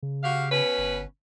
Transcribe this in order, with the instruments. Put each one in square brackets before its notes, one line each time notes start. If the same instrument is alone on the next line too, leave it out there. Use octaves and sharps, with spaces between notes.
[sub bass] C#3
[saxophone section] F#4 G4 F5
B2 C#4 B4
[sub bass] G1